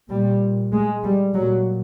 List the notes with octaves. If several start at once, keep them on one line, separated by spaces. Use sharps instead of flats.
A#2 G3
G#3
G3
A#2 F#3